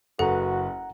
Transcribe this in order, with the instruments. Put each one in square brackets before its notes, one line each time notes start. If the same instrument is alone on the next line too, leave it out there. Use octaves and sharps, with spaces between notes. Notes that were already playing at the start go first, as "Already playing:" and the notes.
[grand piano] F#1 B4 [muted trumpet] F#4 [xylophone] A4 [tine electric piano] F#5 A#5